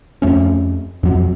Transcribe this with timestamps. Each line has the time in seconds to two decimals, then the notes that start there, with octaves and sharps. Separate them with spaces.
0.22 F2 A3 C#4
1.03 F2 F#3